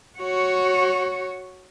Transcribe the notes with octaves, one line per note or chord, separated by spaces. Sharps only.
F#4 C#5